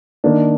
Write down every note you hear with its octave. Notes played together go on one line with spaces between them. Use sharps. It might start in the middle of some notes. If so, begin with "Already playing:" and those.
D#3 A#3 D4